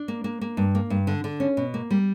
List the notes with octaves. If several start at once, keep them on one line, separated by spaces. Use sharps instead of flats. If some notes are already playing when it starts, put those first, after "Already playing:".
Already playing: D4
A#3
A#3
A#3
G2
A#3
G2
D3
D3
C#4
B2
A#3
G3